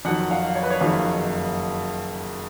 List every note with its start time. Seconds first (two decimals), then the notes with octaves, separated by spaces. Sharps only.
0.05 F2 D#3 F#3 F#5
0.31 F5
0.55 C#5
0.63 B4
0.70 C#5
0.81 F#1 F2 D#3 F#3 F5